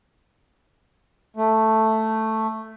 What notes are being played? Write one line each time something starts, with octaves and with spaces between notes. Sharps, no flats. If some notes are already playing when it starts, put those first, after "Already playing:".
A3